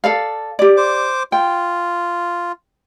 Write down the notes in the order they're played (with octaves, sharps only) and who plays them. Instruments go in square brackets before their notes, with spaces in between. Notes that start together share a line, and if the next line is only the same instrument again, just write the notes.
[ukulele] A4 D5 F5
G4 D5
[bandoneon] C5 D6
[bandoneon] F4 [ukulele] G5